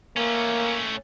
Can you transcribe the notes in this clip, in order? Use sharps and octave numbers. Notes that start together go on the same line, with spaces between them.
A3 A#3 C#4